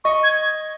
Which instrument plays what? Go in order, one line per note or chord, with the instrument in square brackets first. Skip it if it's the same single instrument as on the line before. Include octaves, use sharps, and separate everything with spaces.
[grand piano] D#5 [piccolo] C#6
[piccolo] G#6